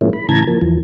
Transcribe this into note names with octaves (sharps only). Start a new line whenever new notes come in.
A2 F3 G#3 A#3 C#4 E4
B5
A2 C#3 E3 A5 A#5 G#6
F3 A#3
E2 E3 F3